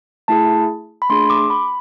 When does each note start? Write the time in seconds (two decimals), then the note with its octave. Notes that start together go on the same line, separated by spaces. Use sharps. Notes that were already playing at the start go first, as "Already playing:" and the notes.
0.28 A3 E4 G#4 A5
1.02 B5
1.10 A3 D4 G#4 C6
1.30 D6
1.50 B5